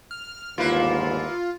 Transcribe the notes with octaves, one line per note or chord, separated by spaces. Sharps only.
F6
G1 D#2 G#2 A#3 E4 F4 B4